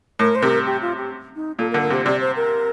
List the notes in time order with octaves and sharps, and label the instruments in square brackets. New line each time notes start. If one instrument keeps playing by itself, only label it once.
[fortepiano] A2 [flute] A#4
[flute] C5
[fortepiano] C3 [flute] A#4
[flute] G4
F4
G4
D#4
[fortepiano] A#2 [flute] A4
[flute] A#4
[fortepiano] D3
[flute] A#4
[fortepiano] C3
[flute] C5
[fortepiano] C3 [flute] D5
[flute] C5
A#4